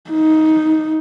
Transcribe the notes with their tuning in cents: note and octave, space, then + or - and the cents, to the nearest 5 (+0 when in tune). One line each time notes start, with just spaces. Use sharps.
D#4 +10